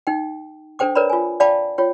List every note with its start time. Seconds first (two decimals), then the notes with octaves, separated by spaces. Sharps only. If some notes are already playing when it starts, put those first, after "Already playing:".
0.07 D#4 G5
0.79 D4 A4 C5 G5 D6
0.95 A#4 B4 C#5 D5 A#5 B5
1.10 F4 G#5
1.40 D5 F5 G5 A5 B5 D6
1.78 F4 C#5 G5